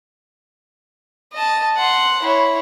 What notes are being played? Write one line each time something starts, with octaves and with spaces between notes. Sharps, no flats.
D#5 A5
F#5 C6
E4 C#5